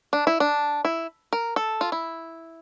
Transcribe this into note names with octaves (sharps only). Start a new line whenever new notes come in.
D4
E4
D4
E4
A#4
A4
F4
E4